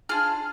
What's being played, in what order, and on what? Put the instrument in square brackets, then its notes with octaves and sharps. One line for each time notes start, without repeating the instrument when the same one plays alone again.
[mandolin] D4 F4 G#4 F6